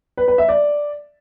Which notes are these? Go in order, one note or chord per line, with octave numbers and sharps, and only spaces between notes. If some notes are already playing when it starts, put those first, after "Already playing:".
B4
B4
E5
D5